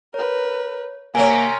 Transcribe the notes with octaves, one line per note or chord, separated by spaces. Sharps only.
A#4 B4 C#5
C3 A#3 C4 C#4 G#5 A#5 D7